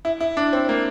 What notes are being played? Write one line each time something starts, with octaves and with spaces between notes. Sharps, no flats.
E4
E4
D4
C4
A#3